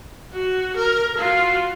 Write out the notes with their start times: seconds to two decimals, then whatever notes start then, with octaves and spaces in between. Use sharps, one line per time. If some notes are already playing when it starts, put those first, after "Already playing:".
0.33 F#4
0.77 A#4
1.18 F4 F#4